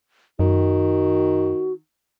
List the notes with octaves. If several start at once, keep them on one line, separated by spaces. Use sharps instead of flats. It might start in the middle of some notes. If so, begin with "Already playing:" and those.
F#2 D#3 F#4